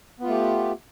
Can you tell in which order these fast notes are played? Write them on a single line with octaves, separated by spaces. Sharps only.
B3 F4 A3 G4